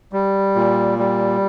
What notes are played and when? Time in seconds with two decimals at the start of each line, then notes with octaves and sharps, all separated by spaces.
0.13 G3
0.56 A#2
0.99 G3